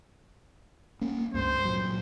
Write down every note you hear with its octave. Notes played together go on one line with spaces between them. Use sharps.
A#3 C#4
C#2 G2 C5
A#2 F#3